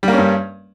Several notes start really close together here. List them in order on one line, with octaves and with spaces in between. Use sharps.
G3 A#3 C#4 G2